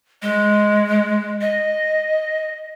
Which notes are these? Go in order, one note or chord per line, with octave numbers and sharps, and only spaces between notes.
G#3
D#5